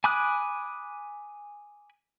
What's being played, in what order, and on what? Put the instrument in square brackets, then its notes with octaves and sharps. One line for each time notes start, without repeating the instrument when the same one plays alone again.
[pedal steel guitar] G#5 B5 D6 D#6 F#6